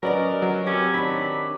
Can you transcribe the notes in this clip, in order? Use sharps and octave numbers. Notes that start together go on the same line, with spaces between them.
F#3 C#4 A#4 B4 D5 D#5
F#3
C4 C#4 G4
D#3 D4 B5